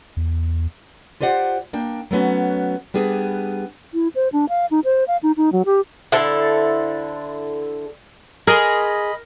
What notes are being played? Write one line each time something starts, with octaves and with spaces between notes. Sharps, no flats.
E2
F4 G4 C5 D5 F#5
A#3 D4 G5
F#3 A3 B3 C#4 F#4
G3 B3 D4 G#4
E4
C5
D4
F5
D#4
C5
F5
D#4
D#4
F#3
G4
D3 E4 A4 C5
G#4 A#4 D#5 B5 C6